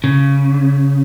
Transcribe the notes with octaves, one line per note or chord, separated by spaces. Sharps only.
C#3